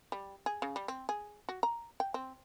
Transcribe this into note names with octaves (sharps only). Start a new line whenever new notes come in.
G3
G#4
C#3
G3
C4
G#4
F#4
A#5
G5
C4